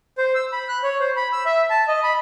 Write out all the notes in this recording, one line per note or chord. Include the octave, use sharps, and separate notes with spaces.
C5
E6
B5
F#6
C#5
C5
B5
E6
E5
A5
D#5
B5